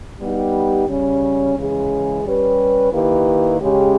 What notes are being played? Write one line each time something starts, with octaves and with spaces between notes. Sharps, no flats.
G3 B3 D#4 G4
C#3 G3 C#4
C#3 E3 G#3 C#4 G#4
G3 C#4 G4 B4
D#3 A#3 E4 G4 B4
C#3 G#3 C#4 G4